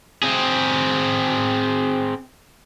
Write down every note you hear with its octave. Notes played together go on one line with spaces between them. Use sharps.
C4 G#4